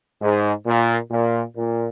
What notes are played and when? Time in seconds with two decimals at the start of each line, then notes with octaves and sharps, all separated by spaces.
0.21 G#2
0.66 A#2
1.11 A#2
1.56 A#2